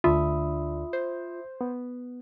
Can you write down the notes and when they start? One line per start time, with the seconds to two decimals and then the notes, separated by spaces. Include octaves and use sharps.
0.04 D2 D3 D4 F4 E5 B5 D#6
0.93 C5
1.61 B3